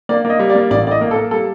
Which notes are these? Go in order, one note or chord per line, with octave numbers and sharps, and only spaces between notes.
A#3 D5
A#3
D#5
G3
D5
A#3
A1 D5
A2 D5
D#5
A#3
A4
A#3
G3 A4